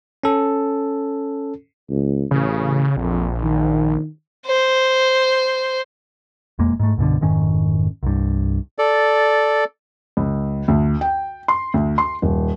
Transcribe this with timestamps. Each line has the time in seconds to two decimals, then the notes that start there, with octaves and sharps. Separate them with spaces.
0.24 C#4 A4
1.90 C#2
2.31 A1 C#3
2.97 A#1 F2
3.43 D#3
4.47 C5
6.59 E1 F2 G#3 A#3
6.79 G#2 A3
6.97 C2 G2 B2 D3
7.21 F1 G#2 D#3 C#4
8.03 C2 G2
8.78 A4 D5
10.17 C#2
10.68 D2
11.01 G5
11.48 C6
11.74 D2
11.98 C6
12.22 D#1